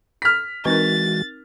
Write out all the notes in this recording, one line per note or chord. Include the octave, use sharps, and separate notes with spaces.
F6 B6
E3 G#3 C4 D#4 F#4 A#4 A6